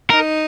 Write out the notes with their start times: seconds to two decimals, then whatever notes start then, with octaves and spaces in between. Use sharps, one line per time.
0.10 D#4 A#4